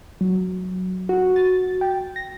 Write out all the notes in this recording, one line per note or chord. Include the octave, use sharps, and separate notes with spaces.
F#3
F#4
A6
G5
A#6